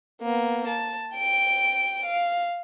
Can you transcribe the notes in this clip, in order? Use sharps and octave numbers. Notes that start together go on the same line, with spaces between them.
A#3 B3
A5
G5 D7
F5